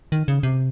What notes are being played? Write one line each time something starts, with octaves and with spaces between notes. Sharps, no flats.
D#3
C#3
C3